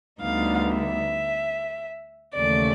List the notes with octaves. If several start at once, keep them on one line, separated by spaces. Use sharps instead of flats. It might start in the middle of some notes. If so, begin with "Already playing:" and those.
D2 D3 G3 B3 D#4 F5
E5
D#2 C#3 E3 A3 D5